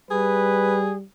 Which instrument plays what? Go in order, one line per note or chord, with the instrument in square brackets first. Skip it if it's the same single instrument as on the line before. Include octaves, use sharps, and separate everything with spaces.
[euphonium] G3 [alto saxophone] G#4 [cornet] B4